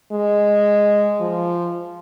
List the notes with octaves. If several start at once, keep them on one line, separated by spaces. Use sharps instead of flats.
G#3
F3